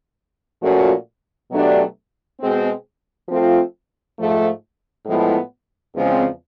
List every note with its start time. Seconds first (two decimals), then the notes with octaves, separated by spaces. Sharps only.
0.62 A#2 F3 A3 C#4 F#4
1.51 B2 F#3 A3 D4 G4
2.39 B2 G#3 C4
3.29 F3 A3 C4 F4
4.18 G#2 F3 A3
5.06 A2 F3 G#3 B3 E4
5.95 E2 C#3 F3 G#3 C4